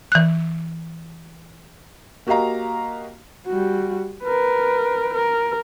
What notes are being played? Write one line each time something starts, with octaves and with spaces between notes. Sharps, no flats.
E3 F#6
A#3 F#4 G4 D#5 F5 A#5
G3 F#4
A#4 B4
A#4